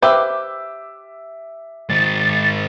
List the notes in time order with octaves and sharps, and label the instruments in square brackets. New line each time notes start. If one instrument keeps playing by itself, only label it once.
[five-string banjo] G4 B4 C5 [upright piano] E5 D6 E6
[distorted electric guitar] G#2 D#3 [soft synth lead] A6